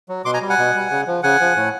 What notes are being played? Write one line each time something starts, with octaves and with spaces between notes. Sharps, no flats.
F#3
B2 C6 D6
G#5 A#5
G3
F#5 G#5
B2
G3
C#3
F3
C#3 F#5 G#5
F3
A2